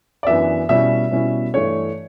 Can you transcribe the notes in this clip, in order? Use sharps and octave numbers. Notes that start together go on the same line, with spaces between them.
D5
F#2 E3 B3 D4 E5
B2 G3 C#4 E4 E5
B2 G3 C#4 E4
G2 E3 A3 D4 C#5